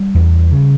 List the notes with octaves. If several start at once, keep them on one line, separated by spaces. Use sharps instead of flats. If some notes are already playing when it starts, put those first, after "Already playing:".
Already playing: G3
E2
C#3